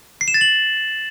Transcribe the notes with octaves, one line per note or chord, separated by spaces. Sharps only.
C7
E7
A6
F#7